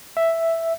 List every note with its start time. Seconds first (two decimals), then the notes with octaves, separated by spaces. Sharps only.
0.17 E5